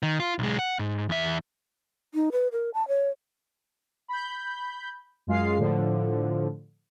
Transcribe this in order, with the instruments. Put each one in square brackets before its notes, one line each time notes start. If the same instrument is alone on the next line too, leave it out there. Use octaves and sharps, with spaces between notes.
[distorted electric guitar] D#3
F4
B1 G#3
F#5
G#2
E2 E5
[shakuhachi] D#4
B4
A#4
A5
C#5
[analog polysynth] B5 G6
F#2 G#3 F4 G#4 F5 C7
A2 D3 F3